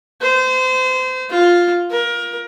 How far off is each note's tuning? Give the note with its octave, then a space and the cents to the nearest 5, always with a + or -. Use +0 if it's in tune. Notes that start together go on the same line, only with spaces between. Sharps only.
C5 -30
F4 +5
A#4 +25